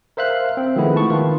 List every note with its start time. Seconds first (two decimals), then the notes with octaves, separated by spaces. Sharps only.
0.17 A#4 C5 E5 F5 F#6
0.57 C4
0.76 D#3 F3 G#3 A3 B3 E4
0.96 A5 C#6
1.10 D#3 F4 B4